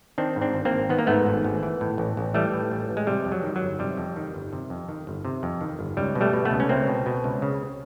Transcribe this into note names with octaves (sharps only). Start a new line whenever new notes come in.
D#3 C4 D4
G#2
C4 D4
G#1
A#3 C4
G#1
D#3 B3
A#3
G#2 A3 B3
G#1
G#1
E3
A2
A1
A1
E3 G3 A3
A2
A1
A1
G#3
C3 G3
F2
F#3
D#3
F#3
G1
C3 G3
F2
D#3
G1
C3
F2
D#3
G1
C3
F2
D#3
G1
C#2 G3
B2
G3 A3
B2
A3 B3
C#2
C#4
C#2 A#3 C4
B2
B2
C#2
C#3